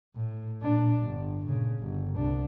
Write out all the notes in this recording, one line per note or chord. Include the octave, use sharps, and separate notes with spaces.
A2
A#2 D4
G1
A#2 C#3
G1
C2 D4